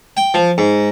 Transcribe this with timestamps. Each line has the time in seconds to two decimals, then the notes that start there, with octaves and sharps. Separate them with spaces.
0.17 G5
0.34 F3
0.58 G#2